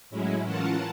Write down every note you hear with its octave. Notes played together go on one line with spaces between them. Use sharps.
A2 F#3 G#3 C#4 E4
E3 C#4 F4 A#4 F#5 A5